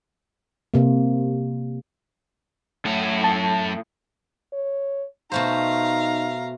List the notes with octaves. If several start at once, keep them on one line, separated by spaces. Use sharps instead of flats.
C3 A#3
F#2 A2 F#5
A5
C#5
B2 A3 D#4 C5 F5 A#5